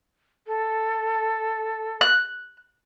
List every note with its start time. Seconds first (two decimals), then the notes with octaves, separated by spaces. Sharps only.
0.47 A4
2.01 F#6